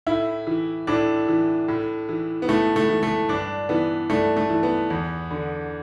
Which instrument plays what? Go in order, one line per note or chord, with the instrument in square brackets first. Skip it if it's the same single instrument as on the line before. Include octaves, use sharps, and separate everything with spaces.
[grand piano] A2 E4
E3
A2 D4
E3
A2
E3
B3
A2 A3
A3
E3
A3
G2 D4
E3 B3
G2 A3
A3
E3
B3
E2
D3